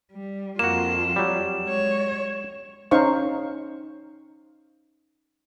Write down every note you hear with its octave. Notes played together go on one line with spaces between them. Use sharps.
G3
F2 A#3 F4 F#4 E7
F#3 G3
G#3 C#5
C#4 D#4 C5 F5 C#6